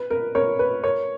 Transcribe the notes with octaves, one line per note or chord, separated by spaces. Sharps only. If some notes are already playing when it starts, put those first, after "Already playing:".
Already playing: B4
A#4
A#4 C#5
B4
A#4 C#5